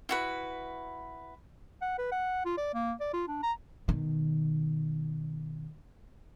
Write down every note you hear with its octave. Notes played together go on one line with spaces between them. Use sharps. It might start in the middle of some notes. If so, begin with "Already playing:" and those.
E4 F#4 B4
F#5
B4
F#5
F4
D5
A#3
D5
F4
D4
A#5
B2 D#3